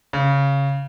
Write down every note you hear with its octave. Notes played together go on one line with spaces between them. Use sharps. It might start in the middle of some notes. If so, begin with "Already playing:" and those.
C#3